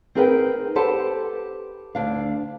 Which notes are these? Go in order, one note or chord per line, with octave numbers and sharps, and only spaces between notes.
C4 D#4 G#4 A#4 B4 G5
G4 A4 B4 C5 F#5 A5
D2 D4 F5